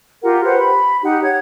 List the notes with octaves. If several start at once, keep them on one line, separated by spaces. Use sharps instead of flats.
F4 G4 A#4 F#5
G4 B4 C5 F#5
B5
D#4 G4 F#5
C#5 F#5 G#6